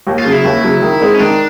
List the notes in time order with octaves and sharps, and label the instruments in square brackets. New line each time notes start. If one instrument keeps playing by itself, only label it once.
[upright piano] D#2
[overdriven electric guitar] F4
[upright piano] C#3 F#3
[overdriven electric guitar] E4
[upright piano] D#2
C#3 F#3
D#3
G#3 C4 D#4
[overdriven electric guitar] C#4
[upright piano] D#3 [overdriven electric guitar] D4